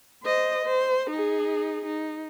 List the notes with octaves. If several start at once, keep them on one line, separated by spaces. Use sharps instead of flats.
C5 D#5
C5
D#4 G#4
D#4